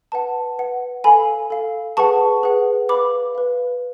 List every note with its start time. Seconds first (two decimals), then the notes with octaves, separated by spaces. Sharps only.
0.12 B4 F#5 A5
0.58 B4 F#5
1.04 A4 F5 G#5 B5
1.50 A4 F5
1.97 G#4 B4 F#5 A5 C#6
2.43 G#4 B4 F#5
2.89 B4 F5 B5 D6
3.35 B4 F5